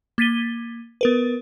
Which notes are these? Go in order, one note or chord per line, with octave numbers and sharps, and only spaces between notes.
A#3 A6 B6 D#7 G7
B3 A#4 B4